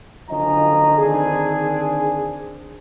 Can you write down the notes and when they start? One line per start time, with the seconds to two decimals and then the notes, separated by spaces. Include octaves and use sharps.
0.29 F#1 D3 F3 C#4 D#5 A#5
0.97 D3 D#3 C4 D4 G#4